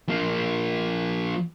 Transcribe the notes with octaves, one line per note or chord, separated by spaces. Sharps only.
F3 A#3